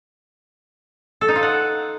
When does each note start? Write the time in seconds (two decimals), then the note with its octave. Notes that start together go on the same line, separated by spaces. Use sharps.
1.21 A4
1.28 D#4
1.35 F4
1.43 F#5